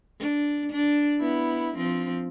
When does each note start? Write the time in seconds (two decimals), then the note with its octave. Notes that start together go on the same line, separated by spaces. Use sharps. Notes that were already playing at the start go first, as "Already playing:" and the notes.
0.20 D4
0.72 D4
1.20 B3 E4
1.77 F3 C4